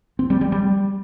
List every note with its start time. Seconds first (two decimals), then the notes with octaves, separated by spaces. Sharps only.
0.19 C4
0.30 G3
0.41 G3
0.52 G3